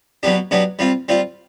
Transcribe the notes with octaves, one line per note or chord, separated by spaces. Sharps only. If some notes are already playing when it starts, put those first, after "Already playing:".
B2 F#3 B3 D4 G4
B2 F#3 B3 D4 G4
G3 C4 F4
G3 C4 F4